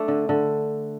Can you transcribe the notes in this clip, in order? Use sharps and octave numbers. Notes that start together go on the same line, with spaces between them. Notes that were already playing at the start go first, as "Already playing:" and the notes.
Already playing: A3 D4
D3
D3